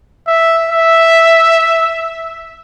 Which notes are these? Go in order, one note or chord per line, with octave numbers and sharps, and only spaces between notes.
E5
E5